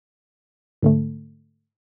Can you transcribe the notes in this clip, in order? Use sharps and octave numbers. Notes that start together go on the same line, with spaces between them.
G#2 D3 A3